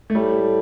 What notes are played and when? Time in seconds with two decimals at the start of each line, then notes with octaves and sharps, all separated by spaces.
0.10 A3
0.15 A2 G3